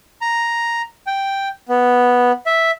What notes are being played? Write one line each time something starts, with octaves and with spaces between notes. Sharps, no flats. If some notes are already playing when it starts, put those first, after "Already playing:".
A#5
G5
B3
E5